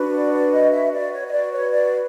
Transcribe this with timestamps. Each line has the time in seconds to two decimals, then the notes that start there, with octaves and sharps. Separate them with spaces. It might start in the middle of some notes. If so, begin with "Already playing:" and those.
Already playing: D4 F#4 B4
0.14 D5
0.33 D5
0.53 D#5
0.72 E5
0.92 F#4 B4 D5
1.12 C#5
1.26 D#5
1.32 D5
1.52 C#5
1.72 D5